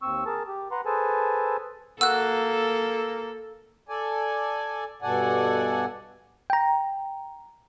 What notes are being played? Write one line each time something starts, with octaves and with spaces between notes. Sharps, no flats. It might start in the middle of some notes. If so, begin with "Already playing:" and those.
D#2 C4 C#6 E6
G#4 A#4 A5
G4
B4 F#5 A#5 C6
G#4 A4 B4 C5 G#5 A5
A#3 F#4 A4 E6 F#6
A4 D5 G#5
G2 B2 A4 D5 F#5 G#5
G5 A#5